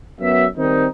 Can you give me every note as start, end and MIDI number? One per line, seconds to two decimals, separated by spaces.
0.21 0.45 42
0.21 0.45 54
0.21 0.45 59
0.21 0.45 76
0.57 0.86 51
0.57 0.86 55
0.57 0.86 60
0.57 0.86 63